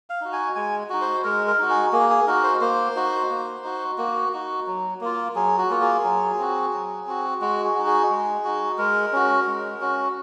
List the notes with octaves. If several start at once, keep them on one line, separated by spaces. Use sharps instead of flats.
F5
D#4 F#4
G#5
G#3 G#5
D#4 F#4
C5
G#3 A#4
A#4
D#4 F#4
G#4
A#3 G#4
G#4
D#4 F#4 A#4
C5
A#3 C5
D#4 F#4
A#3
D#4 F#4
A#3 F#4
D#4 F#4
F#3
A#3 F4
F#3 G#4
F#4
A#3 F4
G#4
F#3
C4 F#4
F#3
C4 F#4
G#3 F#4
G#4
D#4 F#4
G#4
G#3
D#4 F#4
G#3 A#4
C#4 F#4
G#3
C#4 F#4